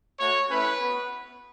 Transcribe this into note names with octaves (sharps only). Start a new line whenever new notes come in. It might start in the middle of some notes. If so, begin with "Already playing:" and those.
A3 F#4 C#5
A3 C#4 E4 B4
B3 F#4